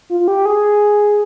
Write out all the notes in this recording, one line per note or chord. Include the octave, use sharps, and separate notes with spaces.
F4
F4
G4
G#4